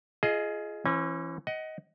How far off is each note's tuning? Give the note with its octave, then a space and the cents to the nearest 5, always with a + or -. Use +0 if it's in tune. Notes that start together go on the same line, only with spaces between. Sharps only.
F4 -20 G#4 +20 D#5 +0
E3 +20 C#4 -35
D#5 +15 F#5 +25